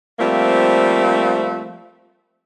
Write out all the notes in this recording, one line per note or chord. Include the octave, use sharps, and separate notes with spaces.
F3 G3 A3 A#3 C4